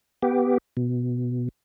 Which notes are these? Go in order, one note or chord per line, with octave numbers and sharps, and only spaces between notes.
B3 G4
B2